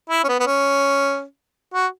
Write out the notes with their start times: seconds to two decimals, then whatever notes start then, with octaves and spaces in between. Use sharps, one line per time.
0.10 E4
0.24 C#4
0.28 B3
0.40 B3
0.47 C#4
1.74 F#4